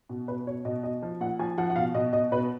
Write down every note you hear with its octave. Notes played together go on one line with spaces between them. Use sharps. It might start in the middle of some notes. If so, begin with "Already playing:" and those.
B2
B2 B4
B2 C#5
B2 D#5
B2 D#5
F3
A#2 F#5
F3 G#5
F3 F#5
F#5
B2 F5
B2 D#5
B2 D#5
B2 B4